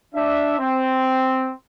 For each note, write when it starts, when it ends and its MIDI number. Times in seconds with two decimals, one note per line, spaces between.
0.15 0.55 62
0.15 0.55 76
0.59 1.51 60